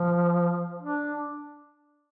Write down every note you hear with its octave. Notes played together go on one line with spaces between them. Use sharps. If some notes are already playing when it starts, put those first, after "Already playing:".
Already playing: F3
D4